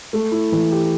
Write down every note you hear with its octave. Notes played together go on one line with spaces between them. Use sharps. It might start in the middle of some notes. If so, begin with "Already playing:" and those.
A3
E4
E3
G4